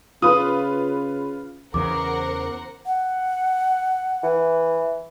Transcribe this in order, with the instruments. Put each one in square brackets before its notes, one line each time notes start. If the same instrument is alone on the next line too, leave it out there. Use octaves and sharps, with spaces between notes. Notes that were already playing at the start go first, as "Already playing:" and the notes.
[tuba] C#3 [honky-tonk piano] F4 B4 [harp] D#6
[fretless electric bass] E2 C#3 E3 [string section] A#4 C5 F#5 [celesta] D6
[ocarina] F#5
[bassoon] E3